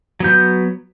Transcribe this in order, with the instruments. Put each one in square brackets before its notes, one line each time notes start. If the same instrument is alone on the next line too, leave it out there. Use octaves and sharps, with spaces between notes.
[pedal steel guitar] F#3 B3 G6